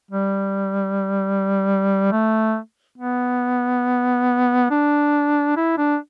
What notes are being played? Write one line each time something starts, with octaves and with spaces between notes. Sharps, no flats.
G3
A3
B3
D4
E4
D4